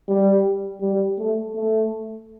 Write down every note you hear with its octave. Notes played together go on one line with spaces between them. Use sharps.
G3
G3
A3
A3